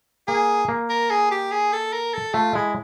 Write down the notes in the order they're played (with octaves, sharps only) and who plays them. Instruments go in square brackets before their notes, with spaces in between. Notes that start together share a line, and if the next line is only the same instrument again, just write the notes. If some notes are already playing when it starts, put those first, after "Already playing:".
[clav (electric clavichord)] A#3 [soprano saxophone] G#4
[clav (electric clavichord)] A#3
[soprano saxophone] A#4
G#4
G4
G#4
A4
A#4
A4
[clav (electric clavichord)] A3 [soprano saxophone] F4
[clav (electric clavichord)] G#3 [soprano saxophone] E4